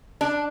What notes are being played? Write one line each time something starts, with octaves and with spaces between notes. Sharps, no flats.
D4